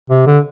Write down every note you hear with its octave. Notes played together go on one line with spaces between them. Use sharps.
C3
D3